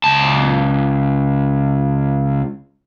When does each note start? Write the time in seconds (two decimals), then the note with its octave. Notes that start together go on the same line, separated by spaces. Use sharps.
0.04 C#2 A5